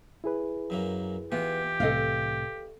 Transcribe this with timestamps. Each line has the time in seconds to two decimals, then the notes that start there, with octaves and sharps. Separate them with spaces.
0.24 E4 G#4 B4
0.70 F#2 F#3 A#3
1.32 E3 B3 F4 G4
1.80 C2 A2 C3 A4 D#5 F5